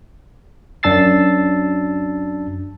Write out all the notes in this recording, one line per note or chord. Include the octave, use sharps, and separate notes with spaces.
F#2 D4 A5 E6 A6 C7